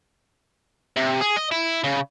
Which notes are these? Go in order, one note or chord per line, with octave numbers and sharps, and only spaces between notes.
C3
G#4
D#5
E4
C#3